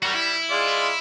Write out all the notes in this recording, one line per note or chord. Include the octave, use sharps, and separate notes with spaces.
G3 F#4 A#4
E4
G#3 F4 D5